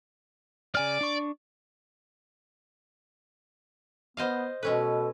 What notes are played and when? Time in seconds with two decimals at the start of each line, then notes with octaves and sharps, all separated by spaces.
0.75 C#3 D5 G#5 F6
1.01 D4 C#6
4.17 B3 C5 D#5 F5
4.63 B2 G#3 C#4 A4 B4